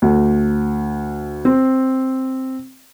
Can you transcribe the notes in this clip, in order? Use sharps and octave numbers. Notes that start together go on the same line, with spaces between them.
D2
C4